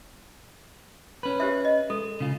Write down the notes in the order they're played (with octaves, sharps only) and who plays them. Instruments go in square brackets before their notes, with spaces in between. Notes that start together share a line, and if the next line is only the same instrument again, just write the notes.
[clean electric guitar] C#4 B4
[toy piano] G4 C5 E5
D#5
[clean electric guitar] G#3 [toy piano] A4
[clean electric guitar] C#3 F4